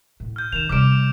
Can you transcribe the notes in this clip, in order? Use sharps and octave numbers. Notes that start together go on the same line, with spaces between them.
A2
F6 G6
D#3 E7 F7
C3 G3 D6 F6 D7